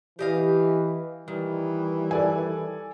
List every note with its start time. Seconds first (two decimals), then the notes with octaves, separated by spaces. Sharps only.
0.19 E3 G4 D#5 F5
1.28 D#3 E3 G3
2.11 A4 D5 G#5